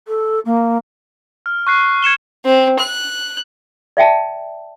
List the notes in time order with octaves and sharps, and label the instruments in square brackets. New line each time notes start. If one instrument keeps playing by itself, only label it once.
[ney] A4
A#3
[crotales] F6
C#6 F#6 C7
G#6 C#7 E7 G7
[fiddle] C4
F#6
[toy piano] D5 E5 G5 A5